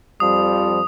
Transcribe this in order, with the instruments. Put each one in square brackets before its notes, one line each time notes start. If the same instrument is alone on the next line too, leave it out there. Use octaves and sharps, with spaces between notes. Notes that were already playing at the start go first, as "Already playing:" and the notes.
[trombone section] F2 F3 G3 [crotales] D#6